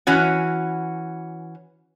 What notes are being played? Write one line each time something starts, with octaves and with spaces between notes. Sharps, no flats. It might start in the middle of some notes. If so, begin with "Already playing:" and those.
E3 C#4 F#4